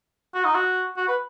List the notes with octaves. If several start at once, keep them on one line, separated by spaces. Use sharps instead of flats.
F#4
D#4
F#4
F#4
B4